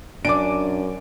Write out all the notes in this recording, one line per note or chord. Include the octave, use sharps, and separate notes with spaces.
F#2 D4 G#5 D6 D7